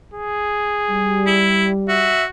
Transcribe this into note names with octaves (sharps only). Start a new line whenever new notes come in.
G#4
G3
E4
F#4 E5